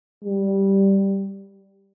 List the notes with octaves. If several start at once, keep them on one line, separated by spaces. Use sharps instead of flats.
G3